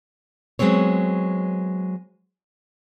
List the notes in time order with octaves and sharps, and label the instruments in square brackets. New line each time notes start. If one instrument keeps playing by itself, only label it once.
[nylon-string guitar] F#3 G#3 B3 C4 C#5